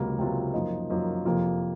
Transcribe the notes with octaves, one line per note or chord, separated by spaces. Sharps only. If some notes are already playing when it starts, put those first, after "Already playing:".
Already playing: C#2 C3 F#3 A#3 F4
C#2 C3 F#3 A#3 F4
F#2 F3 A#3 D#4
F#2 F3 A#3 D#4
F2 C3 F3 A#3 F4